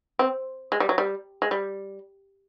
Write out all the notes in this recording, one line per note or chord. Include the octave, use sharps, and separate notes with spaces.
C4
G#3
G3
F#3
G3
G#3
G3